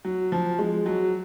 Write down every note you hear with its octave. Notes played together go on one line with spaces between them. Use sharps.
F#3
F3
G#3
F#3